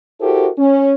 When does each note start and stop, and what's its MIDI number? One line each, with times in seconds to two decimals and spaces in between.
0.21 0.48 64
0.21 0.48 66
0.21 0.48 67
0.21 0.48 69
0.21 0.48 70
0.21 0.48 72
0.58 0.95 61